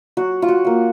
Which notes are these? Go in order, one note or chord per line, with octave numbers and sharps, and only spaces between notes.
F#3 F#4
F4
F#4
A#3 F4